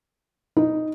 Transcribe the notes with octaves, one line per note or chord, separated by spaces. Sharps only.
D#4